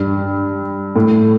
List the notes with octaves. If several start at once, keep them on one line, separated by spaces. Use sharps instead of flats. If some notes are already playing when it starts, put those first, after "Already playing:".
Already playing: G2
A2